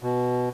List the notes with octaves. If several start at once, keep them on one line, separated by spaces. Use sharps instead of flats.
B2